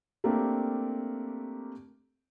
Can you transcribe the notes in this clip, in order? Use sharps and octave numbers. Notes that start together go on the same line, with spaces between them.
A3 A#3 C4 D4 G4 A#4